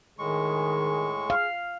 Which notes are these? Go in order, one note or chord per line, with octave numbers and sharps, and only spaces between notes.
A2 D#3 G#3 G#4 C#6
F5